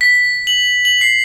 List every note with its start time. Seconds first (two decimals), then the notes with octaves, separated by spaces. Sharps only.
0.01 B6
0.47 F#7
0.85 F#7
1.01 C7